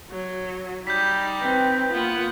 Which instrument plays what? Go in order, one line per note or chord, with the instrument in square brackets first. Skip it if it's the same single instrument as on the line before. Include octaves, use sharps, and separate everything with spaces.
[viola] F#3
[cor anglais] G3 [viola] D#4 [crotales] G6 B6
[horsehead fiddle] C4 B4
[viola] A#3 F#5 [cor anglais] B3 [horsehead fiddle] F4